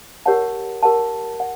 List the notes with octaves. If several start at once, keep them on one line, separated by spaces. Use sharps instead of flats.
G4 A#4 C#5 F#5 A5
G4 A#4 C#5 F#5 A5
F#5